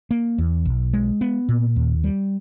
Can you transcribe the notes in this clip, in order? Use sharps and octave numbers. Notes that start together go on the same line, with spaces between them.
A#3
E2
B1
G#3
B3
A#2
D#2
G3